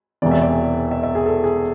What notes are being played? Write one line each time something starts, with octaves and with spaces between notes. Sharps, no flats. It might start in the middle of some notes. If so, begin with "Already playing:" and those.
E1 E2 C3 E3 B3 D5
E5
D5
E5
E5
G#4
A4
G#4